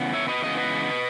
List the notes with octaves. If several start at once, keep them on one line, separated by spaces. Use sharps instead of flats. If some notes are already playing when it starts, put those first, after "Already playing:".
Already playing: E2 C#3 B3
C#5 E5
B4 D#5
E2 C#3 G#3 B3 D#5
B4 D#5